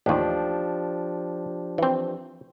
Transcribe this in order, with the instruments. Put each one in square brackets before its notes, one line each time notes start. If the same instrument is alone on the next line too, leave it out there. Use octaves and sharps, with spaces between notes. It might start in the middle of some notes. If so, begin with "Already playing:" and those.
[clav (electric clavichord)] A1 D#2 [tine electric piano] F3 D4 G4
[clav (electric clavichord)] E3 C4